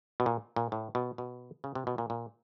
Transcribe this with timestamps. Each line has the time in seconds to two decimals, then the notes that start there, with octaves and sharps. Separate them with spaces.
0.20 B2
0.26 A#2
0.56 A#2
0.72 A2
0.95 B2
1.18 B2
1.64 C#3
1.75 C3
1.87 B2
1.98 A#2
2.10 A#2